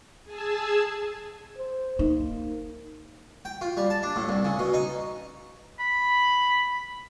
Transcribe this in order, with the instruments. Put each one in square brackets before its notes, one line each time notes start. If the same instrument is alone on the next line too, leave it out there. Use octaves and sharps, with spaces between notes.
[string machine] G#4 G#5 A5 E6
[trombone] C5
[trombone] A#3 [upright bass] D#4
[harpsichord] G5
F4
G3
A5
D4
A2
C2
C#3
B2
D#4
[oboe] B5